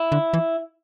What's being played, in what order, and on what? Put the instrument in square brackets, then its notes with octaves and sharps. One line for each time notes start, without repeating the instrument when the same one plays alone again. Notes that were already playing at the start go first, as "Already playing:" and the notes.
Already playing: [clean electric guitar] E4
[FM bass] D3
E3